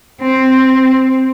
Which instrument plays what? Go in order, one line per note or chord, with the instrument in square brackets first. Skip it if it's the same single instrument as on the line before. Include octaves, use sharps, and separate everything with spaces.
[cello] C4